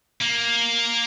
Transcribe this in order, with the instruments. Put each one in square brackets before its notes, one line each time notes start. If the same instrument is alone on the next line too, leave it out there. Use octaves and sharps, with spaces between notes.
[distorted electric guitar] A#3